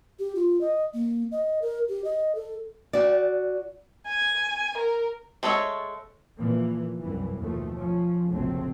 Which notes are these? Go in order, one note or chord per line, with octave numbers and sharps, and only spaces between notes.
G4
F4
D#5
A#3
D#5
A#4
G4
D#5
A4
F#4 D5
G#5
A#4
G#3 A3 A4 C#5 E5
A#2 E3 F3 A#3
C2 F#2 E3
D#2 B2 D#3 F3 A3
F3 C#4
F1 A#1 C#3 F#3 A3 C4